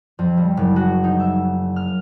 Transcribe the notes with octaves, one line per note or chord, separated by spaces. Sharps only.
F2
G3
F#1
F#4
D#4
E5
F6